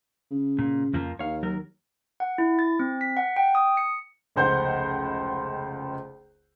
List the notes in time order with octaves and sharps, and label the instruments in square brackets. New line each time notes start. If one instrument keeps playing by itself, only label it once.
[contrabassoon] C#3
[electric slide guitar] A#2
F2 F3 A#3
[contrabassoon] D#2 [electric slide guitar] C#5 F5
[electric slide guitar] F#3 A#4
[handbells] F#5
E4
A6
C4
B6
F#5
G5
D#6
C#7
[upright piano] F1 C#2 C5 F#5 G6